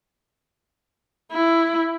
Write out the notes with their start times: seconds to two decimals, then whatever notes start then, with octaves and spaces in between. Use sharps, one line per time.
1.32 E4